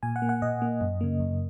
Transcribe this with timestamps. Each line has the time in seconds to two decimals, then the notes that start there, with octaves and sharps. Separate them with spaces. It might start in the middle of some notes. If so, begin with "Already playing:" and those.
0.03 A#2 G#5
0.16 F#5
0.22 A#3
0.29 F#5
0.42 A#2 D#5
0.62 A#3
0.81 F#2
1.01 C#3 A#3
1.20 F#2